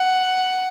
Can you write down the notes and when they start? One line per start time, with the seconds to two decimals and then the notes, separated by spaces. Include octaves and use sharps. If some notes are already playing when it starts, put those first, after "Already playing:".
Already playing: F#5